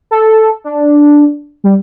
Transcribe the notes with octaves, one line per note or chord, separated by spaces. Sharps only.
A4
D4
G3